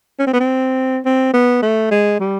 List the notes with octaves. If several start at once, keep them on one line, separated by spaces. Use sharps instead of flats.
C#4
C4
B3
C4
C4
B3
A3
G#3
G3